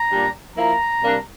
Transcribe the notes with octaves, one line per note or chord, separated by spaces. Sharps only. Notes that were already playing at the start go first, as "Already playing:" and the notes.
Already playing: A#5
A#2 G3 D4
F3 A#3 E4 A#5
C3 G3 A#3 D4